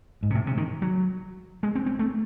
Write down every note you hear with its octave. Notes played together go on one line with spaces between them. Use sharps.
G#2
C3
A2
C3
D#3
F#3
G#3
C4
C4
A3